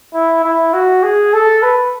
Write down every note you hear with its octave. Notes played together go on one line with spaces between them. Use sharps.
E4
E4
F#4
G#4
A4
B4